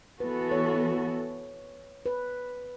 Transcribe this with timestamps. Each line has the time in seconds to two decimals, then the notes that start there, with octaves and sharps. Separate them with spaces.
0.20 E3 B3 F#4 A4 B4
0.51 C#5
2.06 B4